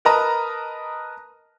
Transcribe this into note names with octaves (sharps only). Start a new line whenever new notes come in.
A#4 B4 D#5 A5 A#5